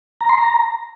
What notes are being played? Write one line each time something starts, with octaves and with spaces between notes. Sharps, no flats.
A#5
C6
A#5